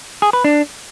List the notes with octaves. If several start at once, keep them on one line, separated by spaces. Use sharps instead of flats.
G#4
B4
D4